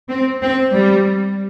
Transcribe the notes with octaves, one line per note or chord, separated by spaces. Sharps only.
C4
C4
G3